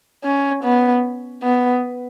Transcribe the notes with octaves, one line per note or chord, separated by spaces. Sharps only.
C#4
B3
B3